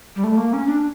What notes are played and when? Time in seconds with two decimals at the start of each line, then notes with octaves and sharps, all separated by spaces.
0.16 G3
0.24 A3
0.37 A#3
0.53 C#4
0.67 D4